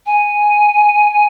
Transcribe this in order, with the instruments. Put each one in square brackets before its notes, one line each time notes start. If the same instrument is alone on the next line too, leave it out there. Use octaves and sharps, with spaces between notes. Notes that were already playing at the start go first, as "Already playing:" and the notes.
[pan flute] G#5